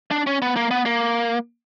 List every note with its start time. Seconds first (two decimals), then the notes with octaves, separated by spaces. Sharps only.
0.11 D4
0.27 C#4
0.42 B3
0.56 A#3
0.71 B3
0.86 A#3